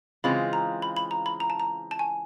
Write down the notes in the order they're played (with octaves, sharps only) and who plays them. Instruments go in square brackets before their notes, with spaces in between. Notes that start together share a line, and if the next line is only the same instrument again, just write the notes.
[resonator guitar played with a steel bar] C#3 E3 G#3 C4 F4 [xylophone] B5
[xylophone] A#5
B5
B5
A#5
B5
A#5
A5
A#5
A5
G#5